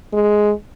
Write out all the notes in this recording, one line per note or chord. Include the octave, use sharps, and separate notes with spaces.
G#3